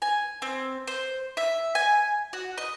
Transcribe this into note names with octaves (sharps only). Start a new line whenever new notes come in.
G#5
C4
C5
E5
G#5
F#4
D#5